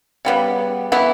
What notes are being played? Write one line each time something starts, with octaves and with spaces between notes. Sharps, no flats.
C#3 G3 B3
E3 B3 E4